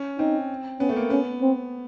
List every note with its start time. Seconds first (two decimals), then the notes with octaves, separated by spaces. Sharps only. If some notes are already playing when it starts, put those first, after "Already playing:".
Already playing: C#4
0.19 C4 D#4
0.80 B3 C#4
0.89 A3
0.96 A#3
1.10 B3 C#4
1.42 C4